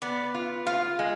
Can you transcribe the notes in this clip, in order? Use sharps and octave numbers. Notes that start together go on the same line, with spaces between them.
B3 D5
F4
F4 F5
G#3